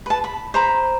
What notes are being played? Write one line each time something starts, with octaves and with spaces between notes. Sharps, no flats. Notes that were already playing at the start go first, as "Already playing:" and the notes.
B4 A5
B5
C5 A#5 B5